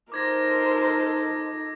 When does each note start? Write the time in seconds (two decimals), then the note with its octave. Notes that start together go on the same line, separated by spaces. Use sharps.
0.12 D#4 A4 A#4 C5 D6 G#6 A#6